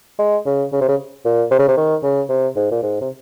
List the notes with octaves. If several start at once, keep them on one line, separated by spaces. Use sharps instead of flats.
G#3
C#3
C#3
C3
C#3
A#2
C3
C#3
C3
D#3
C#3
C3
G#2
A#2
G#2
C3